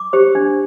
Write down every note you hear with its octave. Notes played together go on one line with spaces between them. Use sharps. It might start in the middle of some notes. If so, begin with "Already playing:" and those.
Already playing: D6
G4 C5
D4